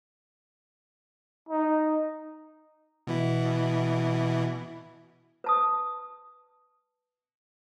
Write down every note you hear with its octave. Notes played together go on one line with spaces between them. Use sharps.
D#4
B2 E3 E4
B4 A5 D#6